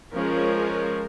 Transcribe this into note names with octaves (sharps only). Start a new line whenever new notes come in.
F3 G#3 C#4 A#4